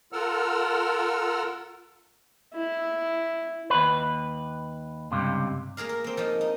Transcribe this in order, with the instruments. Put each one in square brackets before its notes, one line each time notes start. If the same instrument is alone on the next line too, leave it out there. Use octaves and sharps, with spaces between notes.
[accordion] F4 A4 A#4 F#5 E6 F6
[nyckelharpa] E4
[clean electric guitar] D#2 B4
C#2 G2 C3
[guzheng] A#3 G#4 A#4 F5
A#4
A#3 C4
F3 A#3 D#4
D#4